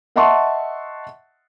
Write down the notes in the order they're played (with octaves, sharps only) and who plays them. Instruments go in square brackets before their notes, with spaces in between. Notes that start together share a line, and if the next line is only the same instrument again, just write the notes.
[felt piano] D#5 E5 F#5 A5 C6 C#6